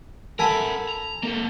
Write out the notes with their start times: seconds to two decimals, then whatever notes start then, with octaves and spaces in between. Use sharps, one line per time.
0.39 A4 A#4 F#5 G#5 B5
0.89 A#5
1.23 A#3 A4